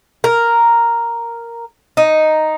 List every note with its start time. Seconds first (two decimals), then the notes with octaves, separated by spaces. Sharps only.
0.24 A#4
1.97 D#4